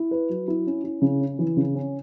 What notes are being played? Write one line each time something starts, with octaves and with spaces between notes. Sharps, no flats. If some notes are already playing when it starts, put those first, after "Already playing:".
Already playing: E4
B4
F#3
E4
C#4
E4
C#3
C#4
E3
C#3
C#4